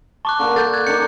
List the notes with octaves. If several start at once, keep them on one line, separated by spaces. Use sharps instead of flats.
A5 C#6 D6 F#6
D3 A#3
A4 G6 A6
F#6 G#6
D#3 D4 C#7